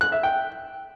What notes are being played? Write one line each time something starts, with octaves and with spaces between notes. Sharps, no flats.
F#6
E5
G5